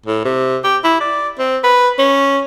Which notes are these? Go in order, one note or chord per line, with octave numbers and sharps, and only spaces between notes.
A2
C3
G4
E4
D5
C4
B4
C#4